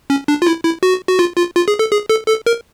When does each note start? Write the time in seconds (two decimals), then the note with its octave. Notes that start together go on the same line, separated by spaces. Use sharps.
0.10 C#4
0.28 D4
0.42 F4
0.47 E4
0.65 E4
0.83 F#4
1.09 F#4
1.19 F4
1.37 F4
1.56 F4
1.68 G#4
1.79 A4
1.92 G#4
2.10 A4
2.28 A4
2.46 A#4